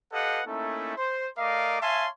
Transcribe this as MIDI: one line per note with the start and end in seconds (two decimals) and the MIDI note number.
0.13 0.41 67
0.13 0.41 69
0.13 0.41 71
0.13 0.41 75
0.13 0.41 77
0.13 0.41 78
0.47 0.95 57
0.47 0.95 58
0.47 0.95 61
0.47 0.95 63
0.47 0.95 64
0.47 0.95 69
0.97 1.27 72
1.38 1.80 57
1.38 1.80 70
1.38 1.80 74
1.38 1.80 75
1.38 1.80 77
1.38 1.80 86
1.81 2.07 73
1.81 2.07 76
1.81 2.07 77
1.81 2.07 80
1.81 2.07 81
1.81 2.07 84